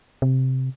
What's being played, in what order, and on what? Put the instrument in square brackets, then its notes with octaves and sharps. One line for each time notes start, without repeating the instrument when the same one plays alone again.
[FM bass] C3